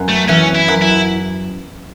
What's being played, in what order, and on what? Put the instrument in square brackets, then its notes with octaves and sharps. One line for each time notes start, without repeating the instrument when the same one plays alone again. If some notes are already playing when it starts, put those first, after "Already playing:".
Already playing: [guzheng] F#2 B3
[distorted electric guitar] A3
[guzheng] E3 [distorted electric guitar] C#4
[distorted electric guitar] E4
[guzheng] F#2
[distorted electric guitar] E4